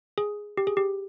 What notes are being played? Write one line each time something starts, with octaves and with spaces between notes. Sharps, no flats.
G#4
G4
G#4
G4